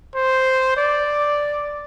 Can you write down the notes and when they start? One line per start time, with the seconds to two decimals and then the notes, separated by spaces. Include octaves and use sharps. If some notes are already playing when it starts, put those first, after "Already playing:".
0.14 C5
0.77 D5